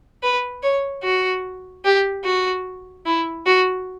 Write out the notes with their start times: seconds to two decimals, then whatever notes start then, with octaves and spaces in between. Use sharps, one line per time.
0.23 B4
0.63 C#5
1.03 F#4
1.85 G4
2.24 F#4
3.06 E4
3.46 F#4